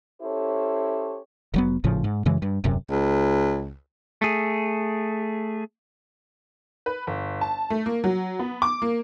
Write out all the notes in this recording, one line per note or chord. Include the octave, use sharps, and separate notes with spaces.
C#4 E4 G4 A4 C5 C#5
F1 F#3 B3
G#1 A2 C#3 F3
G#2
F#2 C#3 E3 G#3
G2
D#1 F#2 C3
C#2
A3 G#4
B4
G1
A5
A3
A#3
F#3
B3
D6
A#3